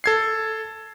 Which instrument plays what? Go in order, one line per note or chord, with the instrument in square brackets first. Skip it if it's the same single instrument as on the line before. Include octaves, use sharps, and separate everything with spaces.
[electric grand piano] A4 G#6 C7